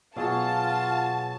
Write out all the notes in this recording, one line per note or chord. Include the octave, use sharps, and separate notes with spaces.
B2 F#3 F4 F#4 G#4 A5